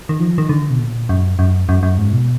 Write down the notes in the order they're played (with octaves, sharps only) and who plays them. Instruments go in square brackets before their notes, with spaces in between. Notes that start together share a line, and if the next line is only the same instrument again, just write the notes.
[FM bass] D#3
F3
D#3
D3
B2
A#2
F#2
F#2
F#2
F#2
G#2
B2